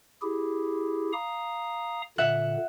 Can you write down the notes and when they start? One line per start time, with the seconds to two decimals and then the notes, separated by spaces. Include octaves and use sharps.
0.22 E4 G4 G#4
1.13 F5 A#5 D#6
2.18 A#2 D3 E5 F#5 F#6